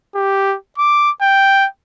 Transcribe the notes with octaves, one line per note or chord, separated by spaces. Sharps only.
G4
D6
G5